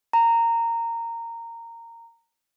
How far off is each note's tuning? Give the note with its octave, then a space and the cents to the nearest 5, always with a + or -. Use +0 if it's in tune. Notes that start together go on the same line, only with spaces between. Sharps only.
A#5 -15